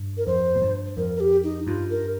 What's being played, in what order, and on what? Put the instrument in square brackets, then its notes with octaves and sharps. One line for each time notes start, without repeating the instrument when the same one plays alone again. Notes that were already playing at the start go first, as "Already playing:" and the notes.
Already playing: [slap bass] G2
[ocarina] A#4
[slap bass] F2 [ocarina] C5
[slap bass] A#2
G2
[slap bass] F2 [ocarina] A#4
[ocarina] A#4
G4
D#4
[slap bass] G2 [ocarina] F4
[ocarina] A#4